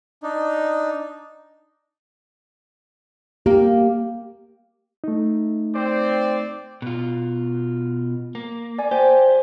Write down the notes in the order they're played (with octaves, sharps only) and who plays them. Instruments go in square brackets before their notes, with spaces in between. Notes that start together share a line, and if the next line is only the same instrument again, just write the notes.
[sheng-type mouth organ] D4 D#4
[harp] A#3 [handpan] G4
[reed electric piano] A3 D#4
[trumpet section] C4 C5 D5
[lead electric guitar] B2 F4
A#3
[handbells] D5 G#5
[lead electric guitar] G4 [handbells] C5 G#5